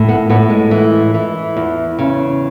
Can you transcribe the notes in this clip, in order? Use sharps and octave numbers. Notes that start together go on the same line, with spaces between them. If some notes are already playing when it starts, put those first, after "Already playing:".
Already playing: A2
B3
A2 B3
G#3
E3
E3
E2
C#3